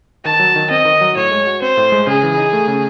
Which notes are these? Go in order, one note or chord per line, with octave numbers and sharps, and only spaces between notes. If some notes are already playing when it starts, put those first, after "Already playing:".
D#3 A5
F#3
D#3
C4 D#5
D#3
F#3
A2 C#5
G#3
F#4
C4 C5
A2
G#3
C#3 G#4
E3
D#4
A3
C#3